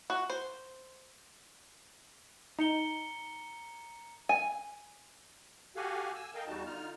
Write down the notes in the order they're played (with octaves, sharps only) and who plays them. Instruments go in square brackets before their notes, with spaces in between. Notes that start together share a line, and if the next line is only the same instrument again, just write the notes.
[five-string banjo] F#4
C5
[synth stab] D#4 [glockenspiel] A#5 C#7 G7
[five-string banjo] G#5
[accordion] F#4 G4 A4 F5 F#5 G#5
G#5 E6
A4 A#4 D#5 F5 G5
E2 G3 D#4 F#4 A5
D3 D#4 F4 F6